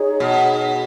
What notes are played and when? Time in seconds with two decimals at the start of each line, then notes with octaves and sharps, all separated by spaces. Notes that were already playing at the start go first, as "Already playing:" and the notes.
Already playing: D#4 G#4 C#5
0.20 B2